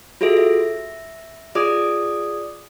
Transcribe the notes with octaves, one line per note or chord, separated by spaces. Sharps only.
F4 F#4 G#4 A4 E5
E5
F4 G#4 D5 D6 D#6